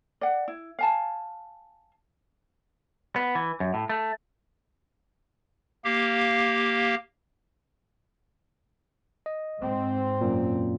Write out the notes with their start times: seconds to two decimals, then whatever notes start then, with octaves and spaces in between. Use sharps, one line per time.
0.21 D5 F#5
0.48 E4
0.79 F5 G#5 A5
3.16 B3
3.35 E3
3.60 F#2
3.74 A2
3.89 A3
5.84 A#3 G4 F5
9.26 D#5
9.59 G#2 C4
10.21 F#2 A#2